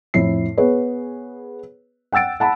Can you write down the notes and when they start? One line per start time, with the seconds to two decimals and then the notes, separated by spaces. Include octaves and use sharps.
0.14 F2 A2 E4 C7
0.57 B3 G#4 B4 C#5
2.12 F#5 G5 E6 A6 D7
2.40 F#5 A5 B5